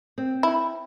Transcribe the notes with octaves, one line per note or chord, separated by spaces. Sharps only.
C4
E4